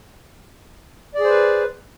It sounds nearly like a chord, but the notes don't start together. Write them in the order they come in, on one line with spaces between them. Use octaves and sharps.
D5 G#4 C5 B4